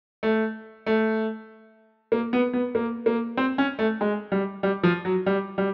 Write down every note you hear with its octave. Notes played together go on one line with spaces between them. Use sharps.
A3
A3
A#3
B3
B3
A#3
A#3
C4
C#4
A3
G#3
G3
G3
F3
F#3
G3
G3